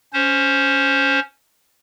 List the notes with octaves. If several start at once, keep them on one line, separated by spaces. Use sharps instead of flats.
C#4 C5